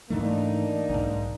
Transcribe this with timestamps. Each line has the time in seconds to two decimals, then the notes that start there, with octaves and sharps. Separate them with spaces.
0.10 G#2 E3 A3 A#3 D4 D#4
0.90 B1 G#2